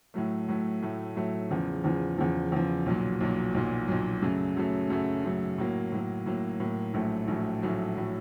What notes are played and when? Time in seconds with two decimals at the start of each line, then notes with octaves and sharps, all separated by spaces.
0.14 A2 F#3 A3
0.48 A2 F#3 A3
0.82 A2 F#3 A3
1.16 A2 F#3 A3
1.51 E2 C#3 F3
1.84 E2 C#3 F3
2.18 E2 C#3 F3
2.52 E2 C#3 F3
2.86 B1 A#2 F#3
3.20 B1 A#2 F#3
3.54 B1 A#2 F#3
3.88 B1 A#2 F#3
4.22 F#2 C#3 F#3 A3
4.57 F#2 C#3 F#3 A3
4.90 F#2 C#3 F#3 A3
5.24 F#2 C#3 F#3 A3
5.58 A2 F#3 A#3
5.92 A2 F#3 A#3
6.26 A2 F#3 A#3
6.60 A2 F#3 A#3
6.94 A#1 A2 F#3 A3
7.28 A#1 A2 F#3 A3
7.62 A#1 A2 F#3 A3
7.97 A2 F#3 A3